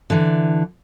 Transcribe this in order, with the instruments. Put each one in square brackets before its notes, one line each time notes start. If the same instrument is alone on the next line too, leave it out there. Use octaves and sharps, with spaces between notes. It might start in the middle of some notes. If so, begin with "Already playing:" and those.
[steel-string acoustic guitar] D3 E3